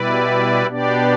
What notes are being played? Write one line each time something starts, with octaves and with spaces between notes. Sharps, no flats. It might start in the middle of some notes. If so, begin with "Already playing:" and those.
Already playing: B2 G3 E4 B4 D5
B2 B3 D4 G4 D5